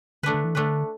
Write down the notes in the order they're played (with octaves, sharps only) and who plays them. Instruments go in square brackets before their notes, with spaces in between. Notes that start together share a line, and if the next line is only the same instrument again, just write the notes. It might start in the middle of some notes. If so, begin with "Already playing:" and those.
[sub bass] D3 [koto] A3 D4 B4
[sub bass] D3
E3
[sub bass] D3 [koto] A3 D4 B4